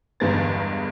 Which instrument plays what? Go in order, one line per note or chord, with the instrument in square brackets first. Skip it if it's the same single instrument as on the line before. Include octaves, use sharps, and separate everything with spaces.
[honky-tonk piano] G1 E2 G2 G#3 A#4 A6